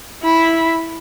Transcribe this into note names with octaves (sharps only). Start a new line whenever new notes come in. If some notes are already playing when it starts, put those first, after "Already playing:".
E4 B5